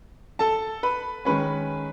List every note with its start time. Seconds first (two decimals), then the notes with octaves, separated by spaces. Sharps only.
0.39 A4 A5
0.83 B4 B5
1.25 D#3 G#3 C#4 B4 B5